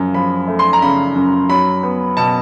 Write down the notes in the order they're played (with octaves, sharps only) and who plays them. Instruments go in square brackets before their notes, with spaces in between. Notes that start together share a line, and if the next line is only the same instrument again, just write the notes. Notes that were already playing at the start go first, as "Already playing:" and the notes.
Already playing: [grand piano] F#2 C#3 F3
F3 B5
A3
C6
A#5
C#3 B5
F#2
F#3 B5
B3
B2 A5